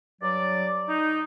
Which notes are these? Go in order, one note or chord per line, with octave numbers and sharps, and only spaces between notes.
G2 F#3 D5
D#4